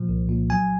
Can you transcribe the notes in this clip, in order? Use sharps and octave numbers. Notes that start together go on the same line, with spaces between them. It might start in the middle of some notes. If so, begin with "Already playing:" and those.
Already playing: A#2 F3
C2
A#2
F#3 G#5